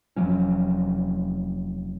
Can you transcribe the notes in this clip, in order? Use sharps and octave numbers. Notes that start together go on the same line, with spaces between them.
F1 F3 F#3 C#4